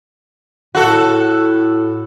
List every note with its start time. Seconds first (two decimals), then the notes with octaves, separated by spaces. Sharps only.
0.75 A2 F#4 A4